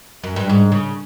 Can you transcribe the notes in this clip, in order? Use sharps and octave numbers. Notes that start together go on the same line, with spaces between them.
F#2
G2
G#2
C#3